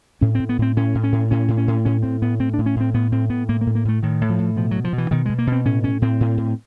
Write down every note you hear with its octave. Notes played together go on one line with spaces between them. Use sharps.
A2 C#4
C4
A2
B3
A2 C4
A2 C#4
A2
C#4
A2
A2 C#4
A2
C#4
A2
A2 C#4
A2 C4
A2 B3
A2 C4
D4
A2
C#4
A2 C4
A2 B3
A2 C4
A2 B3
A2 A#3
A#3
A2
A#3
A2 A3
A2 D#3
A2
F3
A2
B2 F3
F#3
B2
F3
B2
E3
B2 D#3
B2 G#3
A#3
B2
C4
A2 C#4
A2 C#4
A2 C4
A2
A2